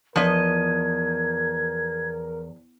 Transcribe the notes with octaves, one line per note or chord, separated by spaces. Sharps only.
E2 F3 A#4 D#5 G#6